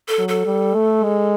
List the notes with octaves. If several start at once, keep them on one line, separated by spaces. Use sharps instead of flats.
A4
F#3
A4
G3
A3
G#3